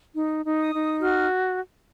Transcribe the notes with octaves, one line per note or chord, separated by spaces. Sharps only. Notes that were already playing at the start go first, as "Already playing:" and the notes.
D#4
D#4
D#6
D#4
F#4 F6